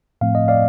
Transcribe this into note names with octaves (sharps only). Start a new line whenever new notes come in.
A2 F3 A3 C4 F5
D#5
D5 F5